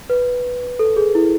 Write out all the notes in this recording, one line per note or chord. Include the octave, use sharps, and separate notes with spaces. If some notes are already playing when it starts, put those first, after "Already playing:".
B4
A4
G#4
E4